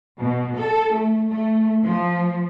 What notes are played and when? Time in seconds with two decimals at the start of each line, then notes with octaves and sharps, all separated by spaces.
0.20 B2
0.58 A4
0.94 A3
1.32 A3
1.85 F3